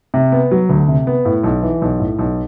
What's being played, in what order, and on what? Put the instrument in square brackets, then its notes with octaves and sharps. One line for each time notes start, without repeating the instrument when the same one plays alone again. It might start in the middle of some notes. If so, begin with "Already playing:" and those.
[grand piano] C3
B3
F#3
D2
C3
B3
A2
B1
E3
B1
A2
B1